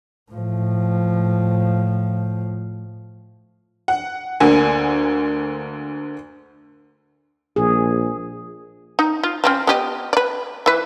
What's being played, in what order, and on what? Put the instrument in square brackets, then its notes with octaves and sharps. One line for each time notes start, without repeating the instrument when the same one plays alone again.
[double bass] A2 F3
[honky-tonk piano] F#5
D2 D3 A#3 F#5 G#5
[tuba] A#1 [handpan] G#4
[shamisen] D#4
F4
F3 C4 C#4
B3 G4 D#5
B4 D5
E3 B4